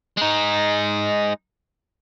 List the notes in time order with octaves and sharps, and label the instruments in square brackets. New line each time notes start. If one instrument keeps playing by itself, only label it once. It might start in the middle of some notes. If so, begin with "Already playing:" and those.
[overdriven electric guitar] G#3 D#4